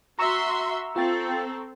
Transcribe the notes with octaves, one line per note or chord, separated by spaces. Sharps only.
F#4 E5 A#5 C6 C#6 E6
C4 F4 A4 G5 A6